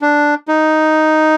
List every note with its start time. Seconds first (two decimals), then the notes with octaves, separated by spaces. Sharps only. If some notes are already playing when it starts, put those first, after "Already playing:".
0.02 D4
0.48 D#4